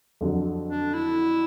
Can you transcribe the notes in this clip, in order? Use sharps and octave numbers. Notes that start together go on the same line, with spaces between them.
F2 D3 F#3
D4
E4